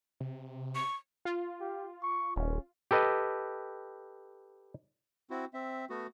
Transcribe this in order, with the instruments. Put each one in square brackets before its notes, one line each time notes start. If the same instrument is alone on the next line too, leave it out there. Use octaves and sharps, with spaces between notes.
[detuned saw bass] C3
[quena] C#6
[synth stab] F4
[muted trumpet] G4
C#6
[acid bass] D#1 [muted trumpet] C#4
[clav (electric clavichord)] G4 A4 B4 D#5
[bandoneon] C4 E4 F#4
C4 E5
A3 B3 F#4